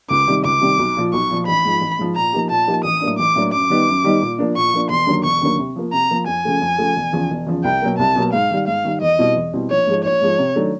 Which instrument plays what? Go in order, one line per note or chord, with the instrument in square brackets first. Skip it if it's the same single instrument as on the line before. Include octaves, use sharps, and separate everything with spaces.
[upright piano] C#2 [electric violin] D6
[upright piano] C3 D#3 G3
[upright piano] C#2 [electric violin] D6
[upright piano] C3 D#3 G3
B1
A#2 F3
[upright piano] B1 [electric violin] C#6
[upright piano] A#2 F3
[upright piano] A1 [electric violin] B5
[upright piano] G#2 F3
A1
G#2 F3
[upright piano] A#2 [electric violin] A#5
[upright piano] F3 A#3 D#4 G4
[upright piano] A#2 [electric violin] A5
[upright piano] F3 A#3 D#4 G4
[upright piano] A1 [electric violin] D#6
[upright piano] A2 F#3 A#3 D4
[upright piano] A1 [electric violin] D6
[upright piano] A2 F#3 A#3 D4
[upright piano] F#2 [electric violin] D6
[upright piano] D#3 G3 B3 D#4
F#2
D#3 G3 B3 D#4
A#2
F3 A#3 D4
[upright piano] A#2 [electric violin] C#6
[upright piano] F3 A#3 D4
[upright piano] E1 [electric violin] C6
[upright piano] D#2 D3 F#3 A#3
[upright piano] E1 [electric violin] C#6
[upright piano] D#2 D3 F#3 A#3
C3
F3 A#3
[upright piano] C3 [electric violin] A#5
[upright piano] F3 A#3
[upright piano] F2 [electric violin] G#5
[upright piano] C#3 F3 A3
F2
C#3 F3 A3
E1
E2 C#3 F3
E1
E2 C#3 F3
[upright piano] C2 [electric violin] G5
[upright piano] B2 F#3 A#3
[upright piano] C2 [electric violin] A5
[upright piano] B2 F#3 A#3
[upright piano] G#2 [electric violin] F5
[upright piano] D#3 G3
[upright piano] G#2 [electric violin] F5
[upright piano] D#3 G3
[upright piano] E2 [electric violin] D#5
[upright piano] B2 G3 C4 E4
E2
B2 G3 C4 E4
[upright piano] A#1 [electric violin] C#5
[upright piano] G#2 F3 G#3
[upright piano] A#1 [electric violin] C#5
[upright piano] G#2 F3 G#3
C3
D#3 F#3 A3 D4